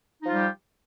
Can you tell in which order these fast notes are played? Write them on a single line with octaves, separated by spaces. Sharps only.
D#4 F3 F4 G3 G4